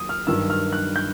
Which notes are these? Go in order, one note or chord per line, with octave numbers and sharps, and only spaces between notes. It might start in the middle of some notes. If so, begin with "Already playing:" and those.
Already playing: D#2 D#3 F#3 D#6
F6
G2 D#3 F#3 E6
F6
F#6
G6